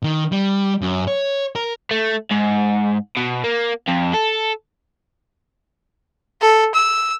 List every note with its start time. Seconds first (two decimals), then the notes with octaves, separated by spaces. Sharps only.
0.04 D#3
0.32 G3
0.82 F#2
1.08 C#5
1.55 A#4
1.91 A3
2.31 G#2
3.17 B2
3.44 A#3
3.88 F2
4.14 A4
6.41 A4
6.75 E6